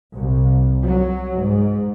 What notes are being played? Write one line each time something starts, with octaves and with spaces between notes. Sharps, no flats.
C2
F#3
G#2